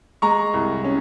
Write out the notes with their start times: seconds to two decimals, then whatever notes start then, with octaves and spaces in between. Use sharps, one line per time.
0.22 G#3 A#5 C#6
0.54 C2
0.84 C#4